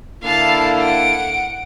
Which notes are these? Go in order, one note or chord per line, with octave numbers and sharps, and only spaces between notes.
D3 A#3 E4 F5 A5
F#5 D7